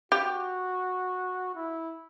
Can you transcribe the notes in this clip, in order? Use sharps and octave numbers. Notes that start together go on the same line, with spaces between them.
F#4 G4
E4